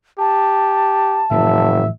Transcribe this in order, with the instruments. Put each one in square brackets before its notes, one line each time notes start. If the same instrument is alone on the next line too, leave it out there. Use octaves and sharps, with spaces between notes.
[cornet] G4 [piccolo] A5
[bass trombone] F#1 [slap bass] A2 E3 F3 [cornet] E5